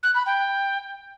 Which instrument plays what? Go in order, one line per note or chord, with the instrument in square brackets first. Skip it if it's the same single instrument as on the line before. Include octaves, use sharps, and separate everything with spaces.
[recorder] F#6
B5
G5